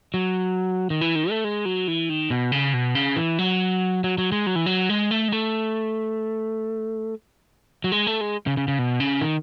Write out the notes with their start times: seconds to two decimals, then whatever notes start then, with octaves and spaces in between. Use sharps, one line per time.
0.14 F#3
0.90 D#3
1.01 E3
1.15 D#3
1.30 A3
1.44 G#3
1.65 F#3
1.88 E3
2.09 D#3
2.31 B2
2.52 C#3
2.74 B2
2.95 C#3
3.16 E3
3.39 F#3
4.04 F#3
4.18 F#3
4.32 G#3
4.47 F#3
4.56 E3
4.66 F#3
4.89 G#3
5.11 A3
5.28 G#3
5.32 A3
7.84 F#3
7.92 G#3
8.07 A3
8.21 G#3
8.47 C#3
8.57 C#3
8.68 C#3
8.79 B2
9.00 C#3
9.21 D#3